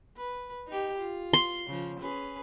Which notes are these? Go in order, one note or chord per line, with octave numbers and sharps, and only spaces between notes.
B4
D#4 G4
F4
C6
C#3 F3
C#4 G#4 B4